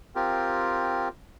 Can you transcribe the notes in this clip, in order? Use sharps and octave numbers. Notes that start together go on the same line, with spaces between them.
C4 F4 G4 A#4